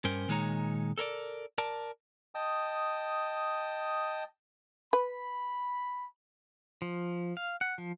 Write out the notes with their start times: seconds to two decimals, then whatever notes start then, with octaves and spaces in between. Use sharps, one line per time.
0.05 G2 C#4 A#4 C5
0.28 A#2 D#3 G#3 D#4 C#5 A#5
0.98 A4 A#4 C#5 D5
1.58 A#4 D5 A5
2.35 D#5 G5 A5 D#6
4.93 B4 B5
6.82 F3
7.37 F5
7.61 F#5
7.78 F3